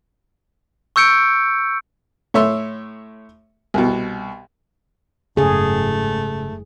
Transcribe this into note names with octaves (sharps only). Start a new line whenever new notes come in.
C#6 E6 G6 C#7 D7
A2 C#5 E5 C6
C2 B2
F#1 G#2 C#3 A3 G#4